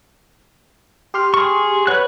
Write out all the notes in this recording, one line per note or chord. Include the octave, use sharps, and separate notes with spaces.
G4 C6 F6
G#4 C#6
B4 C#5 F#5 F#6